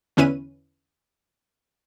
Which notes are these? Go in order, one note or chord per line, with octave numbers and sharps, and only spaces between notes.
E2 D3 C#4 E4 B4 D#7